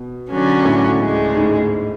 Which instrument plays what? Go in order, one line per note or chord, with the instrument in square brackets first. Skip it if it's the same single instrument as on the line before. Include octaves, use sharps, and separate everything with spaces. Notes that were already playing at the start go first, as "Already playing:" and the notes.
Already playing: [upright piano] B2
[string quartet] D3 F#3 C#4
[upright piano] A2
[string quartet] D2 C#3 G#3
[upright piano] G#2